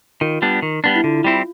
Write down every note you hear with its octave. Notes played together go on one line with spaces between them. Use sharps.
D#3 F4
G3 B3 D4
D#3
G3 B3 D4
E4
D3 F4
F4
G3 C4 E4